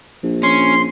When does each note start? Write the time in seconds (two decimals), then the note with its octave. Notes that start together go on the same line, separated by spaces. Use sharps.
0.23 A#1
0.43 C#4 C6